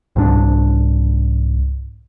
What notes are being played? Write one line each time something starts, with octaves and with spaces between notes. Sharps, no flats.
C2 G#2 G3 D4